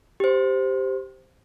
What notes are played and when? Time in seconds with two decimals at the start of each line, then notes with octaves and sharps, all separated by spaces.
0.20 G4 C5